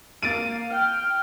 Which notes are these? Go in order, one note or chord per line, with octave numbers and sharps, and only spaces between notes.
A#3 F5 A6 D7 D#7
G5 F6